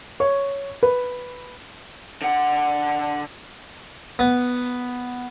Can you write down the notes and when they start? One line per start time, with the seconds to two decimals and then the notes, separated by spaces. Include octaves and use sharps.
0.20 C#5
0.83 B4
2.22 D3 F#5
4.19 B3